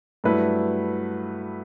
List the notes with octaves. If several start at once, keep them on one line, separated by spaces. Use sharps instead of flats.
G2 F#3 A3 E4 B4